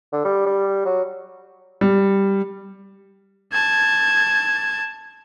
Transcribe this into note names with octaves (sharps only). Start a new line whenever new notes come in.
D3
G3
G3
F#3
G3
A5 G#6